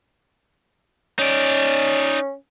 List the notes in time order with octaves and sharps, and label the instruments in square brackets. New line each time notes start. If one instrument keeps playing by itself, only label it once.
[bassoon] C#4 [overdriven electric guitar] D#4 D5